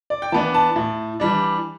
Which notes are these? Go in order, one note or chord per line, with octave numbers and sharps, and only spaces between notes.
D5
G5
E3 B3 D4 A5
A5
A2
E3 G3 D4